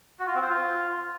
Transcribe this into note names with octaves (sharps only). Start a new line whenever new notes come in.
F#4
F4
C4
C5
F4